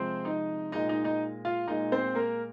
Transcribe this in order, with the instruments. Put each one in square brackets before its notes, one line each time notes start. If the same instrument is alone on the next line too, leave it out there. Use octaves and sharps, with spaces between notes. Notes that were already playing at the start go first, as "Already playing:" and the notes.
Already playing: [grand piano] C3 F3 G#3 C4 C5
D#4 D#5
A#2 G#3 D#4 D#5
D#4 D#5
D#4 D#5
F4 F5
A#2 G#3 D#4 D#5
C4 C5
A#3 A#4